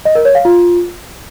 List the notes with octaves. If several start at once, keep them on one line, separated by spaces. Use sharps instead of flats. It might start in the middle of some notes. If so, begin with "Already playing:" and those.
D#5
A#4
C#5
F5
F4